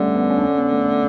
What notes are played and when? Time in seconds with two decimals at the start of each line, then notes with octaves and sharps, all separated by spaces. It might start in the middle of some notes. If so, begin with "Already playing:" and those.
Already playing: D3 G3 A3 C#4
0.15 B3
0.30 C#4
0.38 D4
0.44 C#4
0.58 B3
0.73 A3
0.87 A3